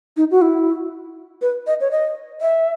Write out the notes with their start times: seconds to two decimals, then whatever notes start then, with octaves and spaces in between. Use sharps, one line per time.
0.17 D#4
0.31 F#4
0.42 E4
1.42 B4
1.67 D#5
1.81 C#5
1.91 D#5
2.41 E5